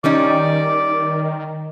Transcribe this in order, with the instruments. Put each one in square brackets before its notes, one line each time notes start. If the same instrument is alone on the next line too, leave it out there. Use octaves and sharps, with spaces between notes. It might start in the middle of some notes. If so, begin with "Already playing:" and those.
[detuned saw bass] D#3 [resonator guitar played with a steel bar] G3 C#4 D#4 [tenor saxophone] D5